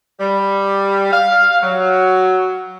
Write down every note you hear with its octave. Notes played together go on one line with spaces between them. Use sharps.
G3
F5
F#3